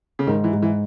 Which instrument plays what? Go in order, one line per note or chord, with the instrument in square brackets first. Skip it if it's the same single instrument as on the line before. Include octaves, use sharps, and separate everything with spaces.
[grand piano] C#3
[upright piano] G#2 [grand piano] D#3
[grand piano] E3
[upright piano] G#2
[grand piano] E3